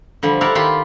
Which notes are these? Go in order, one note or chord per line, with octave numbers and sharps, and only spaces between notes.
D3 F3 G3
E4 A#4 C#5 D5 F5 F#5
D#3 F4 G4 A5 B5 C6